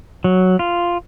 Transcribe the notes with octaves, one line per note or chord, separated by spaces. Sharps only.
F#3
F4